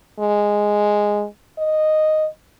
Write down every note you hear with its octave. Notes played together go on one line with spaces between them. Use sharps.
G#3
D#5